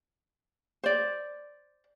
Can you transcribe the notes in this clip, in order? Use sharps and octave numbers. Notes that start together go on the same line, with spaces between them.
C5 D5